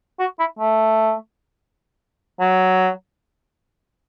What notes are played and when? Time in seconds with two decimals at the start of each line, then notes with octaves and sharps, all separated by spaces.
0.20 F#4
0.39 E4
0.59 A3
2.40 F#3